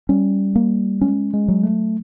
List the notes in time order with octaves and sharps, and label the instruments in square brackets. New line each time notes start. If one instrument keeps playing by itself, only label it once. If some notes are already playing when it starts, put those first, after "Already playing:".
[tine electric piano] G3 [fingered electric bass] C#4
[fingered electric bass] A#3
[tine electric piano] G#3 [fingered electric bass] C#4
[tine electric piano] G#3
[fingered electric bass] F#3
[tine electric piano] A3